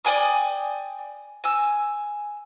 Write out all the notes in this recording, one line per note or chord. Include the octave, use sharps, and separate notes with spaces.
D5 G5 G#5 D#6
G#5 E6